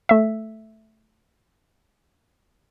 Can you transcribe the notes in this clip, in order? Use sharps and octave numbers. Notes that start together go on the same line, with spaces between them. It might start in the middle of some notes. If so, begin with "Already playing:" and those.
A3 E5